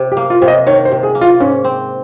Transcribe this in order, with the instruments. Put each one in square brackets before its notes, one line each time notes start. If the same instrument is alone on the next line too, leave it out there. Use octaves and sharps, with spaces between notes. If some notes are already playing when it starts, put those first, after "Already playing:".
Already playing: [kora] C3
[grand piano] G4
[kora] A#3
[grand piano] F4
[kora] C3
[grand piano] D#5
[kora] D#3 [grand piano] C#5
[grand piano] C5
[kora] C3
[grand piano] G#4
[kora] A#3
[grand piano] F4
[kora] G#2 [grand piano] C#4
[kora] C4